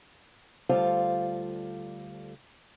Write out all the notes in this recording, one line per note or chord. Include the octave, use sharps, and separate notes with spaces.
D2 G3 F4 A4 C5 F5